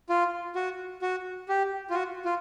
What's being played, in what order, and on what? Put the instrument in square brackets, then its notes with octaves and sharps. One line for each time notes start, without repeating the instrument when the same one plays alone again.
[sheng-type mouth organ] F4
F#4
F#4
G4
F4
F#4
F4